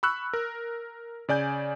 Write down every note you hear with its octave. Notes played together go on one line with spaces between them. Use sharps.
B5 C#6 E6 F#6
A#4
C#3 D5 G#5 G6